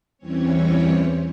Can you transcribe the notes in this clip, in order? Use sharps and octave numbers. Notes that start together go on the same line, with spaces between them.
E2 E3 G3 C4 C#4 C#5